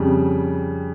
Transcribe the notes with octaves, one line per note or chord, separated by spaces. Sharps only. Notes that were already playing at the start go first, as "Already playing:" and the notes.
Already playing: F2 C#3 G3